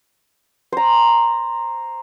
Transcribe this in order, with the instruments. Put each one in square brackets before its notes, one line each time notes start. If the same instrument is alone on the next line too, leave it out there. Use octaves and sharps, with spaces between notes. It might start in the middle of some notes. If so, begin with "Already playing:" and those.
[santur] C5 A#5